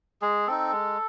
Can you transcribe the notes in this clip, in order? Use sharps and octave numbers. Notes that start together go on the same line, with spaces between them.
G#3 G#4
C4 D#4 A4
G#3